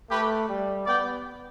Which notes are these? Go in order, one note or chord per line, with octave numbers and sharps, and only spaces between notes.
A3 G4 B4
G3
B3 D5 G5